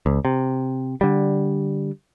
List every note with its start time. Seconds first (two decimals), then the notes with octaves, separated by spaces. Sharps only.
0.06 C#2
0.25 C3
1.01 D3 G3